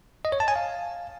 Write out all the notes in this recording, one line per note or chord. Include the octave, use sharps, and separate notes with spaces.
D#5
C#5
A5
G#5
F5